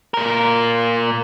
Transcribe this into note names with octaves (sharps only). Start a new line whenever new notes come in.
A#2 A#4